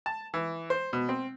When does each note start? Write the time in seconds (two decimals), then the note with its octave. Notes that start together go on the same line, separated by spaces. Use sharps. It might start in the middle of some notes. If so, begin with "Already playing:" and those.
0.06 A5
0.34 E3
0.70 C5
0.93 B2
1.09 C4